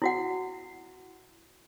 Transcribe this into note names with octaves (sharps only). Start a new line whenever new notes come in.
E4 F#4 F#5